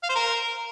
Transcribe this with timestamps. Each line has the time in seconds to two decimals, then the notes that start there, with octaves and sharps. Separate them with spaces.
0.03 F5
0.09 C5
0.16 A#4